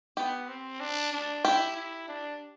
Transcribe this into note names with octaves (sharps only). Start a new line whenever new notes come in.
B3 G4
C4
D4
D4
E4 G4
E4
D4